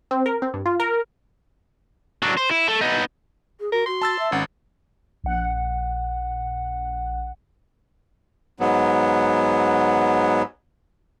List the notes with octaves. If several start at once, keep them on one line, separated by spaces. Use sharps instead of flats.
C4
A#4
C4
G2
F4
A#4
F#3 D4
C5
E4
A3
B3 D#4
G#4
F#4 A#4
F#4 C6
A5 E6 A6
E5
G#1 C#4 F#5
A#1 F#5
G#2 F#3 B3